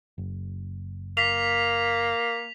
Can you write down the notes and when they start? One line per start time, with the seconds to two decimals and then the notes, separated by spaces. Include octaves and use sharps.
0.18 F#1
1.17 A#3 B6 F7